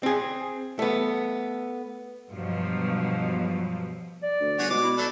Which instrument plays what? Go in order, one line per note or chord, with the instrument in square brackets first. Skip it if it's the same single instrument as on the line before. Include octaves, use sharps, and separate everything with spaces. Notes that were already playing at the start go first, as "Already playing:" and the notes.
[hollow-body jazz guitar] C4 G#4
A3 B3
[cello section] G2 B2 F3 F#3
[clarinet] D5
[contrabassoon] D2
[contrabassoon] G1 [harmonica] F#4 G#4 C#5
[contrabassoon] B2 [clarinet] G#3 [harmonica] D6
[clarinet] E4
[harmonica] F#3 A3 A4 [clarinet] D5